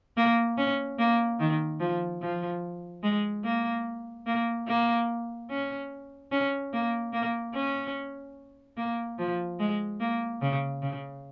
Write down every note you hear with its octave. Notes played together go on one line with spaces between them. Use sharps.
A#3
C#4
A#3
D#3
F3
F3
G#3
A#3
A#3
A#3
C#4
C#4
A#3
A#3
C#4
A#3
F3
G#3
A#3
C#3
C#3